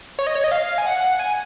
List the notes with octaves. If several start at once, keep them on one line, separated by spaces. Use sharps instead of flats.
C#5
D#5
C#5
D#5
F5
G#5
F#5
G#5